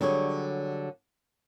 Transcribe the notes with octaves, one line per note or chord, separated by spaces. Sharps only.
D3 F#3 G3 G#4 C#5